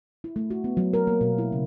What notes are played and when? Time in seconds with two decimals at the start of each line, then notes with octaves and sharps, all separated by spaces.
0.24 E4
0.36 A3
0.50 F#4
0.64 B3
0.77 F#3
0.94 A#4
1.07 A#3
1.21 B2
1.38 E4
1.52 C#3